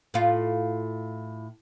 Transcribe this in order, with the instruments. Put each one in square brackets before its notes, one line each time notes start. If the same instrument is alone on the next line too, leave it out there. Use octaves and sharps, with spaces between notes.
[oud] A2 F4